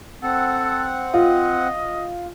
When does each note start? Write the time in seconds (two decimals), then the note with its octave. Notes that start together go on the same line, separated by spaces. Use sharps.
0.23 C4 A4 F#5
1.14 F4 D#5